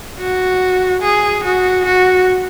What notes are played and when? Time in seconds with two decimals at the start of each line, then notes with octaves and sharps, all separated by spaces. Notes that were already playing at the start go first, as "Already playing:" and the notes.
0.20 F#4
1.02 G#4
1.44 F#4
1.85 F#4